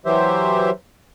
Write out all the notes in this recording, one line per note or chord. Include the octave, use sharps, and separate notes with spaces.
E3 F#3 G4 C5 E5